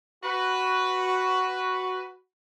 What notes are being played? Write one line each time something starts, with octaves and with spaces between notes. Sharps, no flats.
F#4 B4